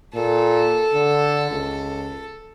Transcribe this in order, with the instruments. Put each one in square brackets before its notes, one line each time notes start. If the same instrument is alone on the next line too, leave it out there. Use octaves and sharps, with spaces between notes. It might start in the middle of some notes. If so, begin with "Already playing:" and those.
[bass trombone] A#2 [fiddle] A4
[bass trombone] D3
C#2